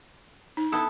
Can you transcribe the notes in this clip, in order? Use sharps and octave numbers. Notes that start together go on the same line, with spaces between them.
D#4
B3 E4 A4 A5 D#6